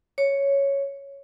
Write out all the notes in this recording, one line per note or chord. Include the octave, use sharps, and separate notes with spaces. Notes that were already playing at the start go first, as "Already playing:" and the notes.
C#5